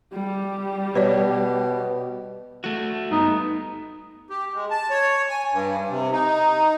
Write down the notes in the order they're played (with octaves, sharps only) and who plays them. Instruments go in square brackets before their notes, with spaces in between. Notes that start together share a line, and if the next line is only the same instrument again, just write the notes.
[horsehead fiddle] G3 G4
[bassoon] B2 [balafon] B4 C#5 D5
[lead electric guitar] A3 F#4
[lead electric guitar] G2 B3 [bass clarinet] D#4
[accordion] G4
G#3
A5
C#5
G#5
G2
C3
D#4